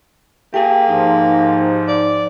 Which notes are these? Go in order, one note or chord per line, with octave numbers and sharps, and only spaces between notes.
A#3 G4 G#4 G5
G#2 F3 D#4
D5